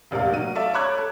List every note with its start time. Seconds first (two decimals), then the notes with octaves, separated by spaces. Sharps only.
0.11 E1 A1 C3 A#4 F5
0.32 F#3 D#7
0.55 A4 D5 E5 F5
0.74 C#5 A#5 B5 D6 F#6 G#6
0.98 A4